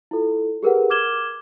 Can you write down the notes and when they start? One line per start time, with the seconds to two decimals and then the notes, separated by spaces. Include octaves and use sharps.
0.11 E4 F4 A4
0.63 G4 G#4 A#4 B4 F#5
0.90 D6 F6 G#6 E7 G7